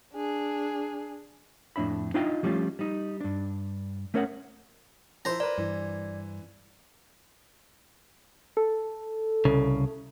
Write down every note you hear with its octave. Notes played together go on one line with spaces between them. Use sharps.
D4 G#4
F2 A2 D4 E5 B5
D4 D#4 F4 D#5 E5 G5
F3 G3 A3 C#4 F4
G3 D#4
G2 D4
A3 C#4 A#4 C#5 D#5 F#5
F3 E4 C5 A#5
A#4 B4 D5
G2 E3
A4
C2 C#3